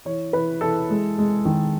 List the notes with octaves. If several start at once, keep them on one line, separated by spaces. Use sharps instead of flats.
E3 C#5
E3 B4
E3 A4
G#3
G#3
D#3